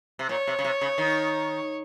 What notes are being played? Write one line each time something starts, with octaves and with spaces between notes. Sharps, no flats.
C3
A#2 C#5
C3
C#3
C3
C#3
D#3